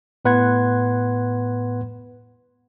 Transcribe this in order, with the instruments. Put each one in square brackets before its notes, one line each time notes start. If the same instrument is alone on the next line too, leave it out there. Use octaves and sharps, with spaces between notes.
[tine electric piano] A2 B3 B4 F#5 C6 G#6